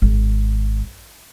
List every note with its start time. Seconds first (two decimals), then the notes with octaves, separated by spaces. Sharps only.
0.02 G#1